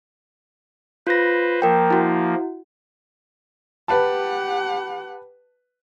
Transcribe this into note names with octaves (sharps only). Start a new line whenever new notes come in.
F4 B4 C5 A#6
F3 A#3 A#4 G5
E4 F#4
G4 B4 F#5 A5